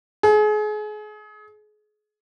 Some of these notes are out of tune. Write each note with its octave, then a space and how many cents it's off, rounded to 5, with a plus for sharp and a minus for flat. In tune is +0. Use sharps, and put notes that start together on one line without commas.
G#4 +35